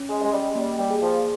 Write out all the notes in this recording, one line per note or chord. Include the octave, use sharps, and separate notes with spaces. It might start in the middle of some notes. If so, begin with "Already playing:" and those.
Already playing: C#4
G#3
G#3 D#5
G3
G3 A#3
G3
G#4
F3